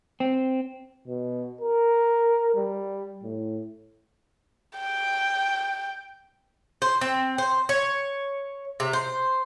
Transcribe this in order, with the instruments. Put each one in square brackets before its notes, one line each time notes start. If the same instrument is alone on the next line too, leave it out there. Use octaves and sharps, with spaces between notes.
[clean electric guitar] C4
[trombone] B2
A#4
G3
A2
[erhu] G5
[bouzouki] C5
C4
C5
C#5
C3
C5